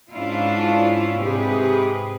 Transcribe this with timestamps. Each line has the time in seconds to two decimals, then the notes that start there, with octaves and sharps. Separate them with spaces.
0.11 G#2 C#4 D4 E4 F4 F5
1.19 G#2 C3 G4 G#4 B4